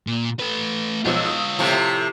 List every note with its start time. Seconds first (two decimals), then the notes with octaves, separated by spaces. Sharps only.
0.07 A#2
0.40 A3 B4
1.05 B1 F3 F4 C#5 E6
1.26 D#6
1.59 A2 C3 F3